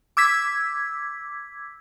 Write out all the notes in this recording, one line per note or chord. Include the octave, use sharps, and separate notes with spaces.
D6 E6 G#6 B6